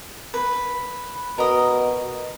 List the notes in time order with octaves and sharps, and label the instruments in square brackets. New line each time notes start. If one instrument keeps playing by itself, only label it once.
[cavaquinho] B4
[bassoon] B2 [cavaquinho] A#4 D#5